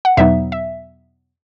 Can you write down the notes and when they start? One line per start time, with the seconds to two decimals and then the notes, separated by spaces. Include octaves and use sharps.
0.05 F#5
0.17 E2 B2 F#3 B3 D#4 E5
0.52 E5